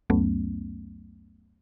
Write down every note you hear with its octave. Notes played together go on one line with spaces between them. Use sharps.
C#2 F#2 F#3 A3 B3 C#4